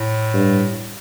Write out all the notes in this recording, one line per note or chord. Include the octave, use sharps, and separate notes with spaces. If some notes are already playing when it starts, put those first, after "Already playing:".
Already playing: A2
G2